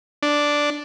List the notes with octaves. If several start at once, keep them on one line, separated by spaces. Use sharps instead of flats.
D4